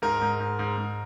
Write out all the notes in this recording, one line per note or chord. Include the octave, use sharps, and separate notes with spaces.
G#2 A#4
G#2
G#2
G#2
G#2